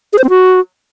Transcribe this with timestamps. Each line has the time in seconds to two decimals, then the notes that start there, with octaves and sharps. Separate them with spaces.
0.13 G#4
0.18 C5
0.24 C4
0.30 F#4